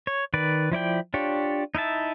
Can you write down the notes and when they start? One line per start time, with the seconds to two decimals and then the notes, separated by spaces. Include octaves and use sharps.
0.07 C#5
0.34 D#3 B4 D5
0.72 F3 E4 D5 G5
1.14 D4 F4 G4 C#5
1.75 D#4 E4 E5 A5